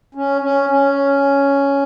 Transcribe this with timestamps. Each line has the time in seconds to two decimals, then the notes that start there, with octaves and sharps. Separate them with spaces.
0.15 C#4
0.41 C#4
0.69 C#4